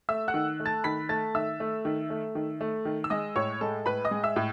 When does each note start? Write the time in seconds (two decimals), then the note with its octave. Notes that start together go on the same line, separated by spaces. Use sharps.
0.09 A3 E5 E6
0.28 F#5 F#6
0.34 D#3
0.60 A3
0.66 A5 A6
0.84 D#3 B5 B6
1.09 A3 A5 A6
1.35 D#3 E5 E6
1.60 A3
1.85 D#3
2.10 A3
2.35 D#3
2.61 A3
2.85 D#3
3.04 E6
3.10 G#3 D#5 D#6
3.36 A2 C#5 C#6
3.61 G#3 A4 A5
3.86 A2 B4 B5
4.05 D#5 D#6
4.11 G#3
4.24 E5 E6
4.36 A2